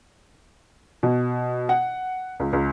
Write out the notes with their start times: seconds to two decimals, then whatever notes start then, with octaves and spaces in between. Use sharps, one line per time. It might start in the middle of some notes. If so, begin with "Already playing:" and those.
1.03 B2
1.69 F#5
2.40 C#2
2.53 C#2